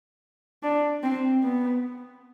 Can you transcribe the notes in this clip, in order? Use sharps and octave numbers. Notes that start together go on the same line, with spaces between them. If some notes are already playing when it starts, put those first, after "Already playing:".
D4
C4
B3